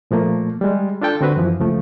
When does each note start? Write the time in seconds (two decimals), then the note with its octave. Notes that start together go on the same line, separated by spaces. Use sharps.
0.11 A#2 F3 A3 A#3
0.61 G3 G#3
1.02 D4 F4 A4 G5 A5
1.21 D3 C4 F#4 B4
1.36 F#2 E3 F3
1.60 C#2 F3 A3